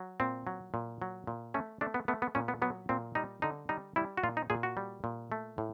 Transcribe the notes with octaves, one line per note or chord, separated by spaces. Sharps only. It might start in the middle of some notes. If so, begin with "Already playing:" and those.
Already playing: F#3
A#2 C4
F#3
A#2
F#3
A#2
A3 C#4
A3 D4
B3
A3 B3
B3
A#2 C#4
B3
F#3 B3
A#2 C4
G3 D#4
D3 D#4
G3 D#4
G3 E4
F#4
A#2 F4
D#4
A#2 G#4
F#4
G3
A#2
A3
A2